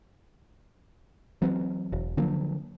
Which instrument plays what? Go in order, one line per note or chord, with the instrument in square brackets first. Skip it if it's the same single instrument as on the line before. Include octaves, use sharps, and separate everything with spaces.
[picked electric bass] E3 F#3 C4
E1
D3 F3 F#3 A#3